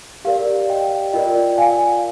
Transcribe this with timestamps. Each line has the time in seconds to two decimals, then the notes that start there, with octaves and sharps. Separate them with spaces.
0.25 G4 A#4 D5 F5
0.69 D#5 G5
1.13 F4 A#4 D5 D#5 G5
1.58 F5 G#5